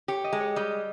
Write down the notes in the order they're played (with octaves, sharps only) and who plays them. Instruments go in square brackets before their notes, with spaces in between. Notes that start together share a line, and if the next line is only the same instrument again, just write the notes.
[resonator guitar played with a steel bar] G4 [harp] C#5
[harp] D#5
[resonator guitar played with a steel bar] G#3
[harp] C#5
[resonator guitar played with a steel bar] G3 [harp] D#5